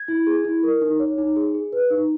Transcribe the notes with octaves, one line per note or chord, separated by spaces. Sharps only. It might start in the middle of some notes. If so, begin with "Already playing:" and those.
Already playing: G#6
E4
G#4
E4
A#4
D#4
C#5
D#4
G#4
G#4
B4
D#4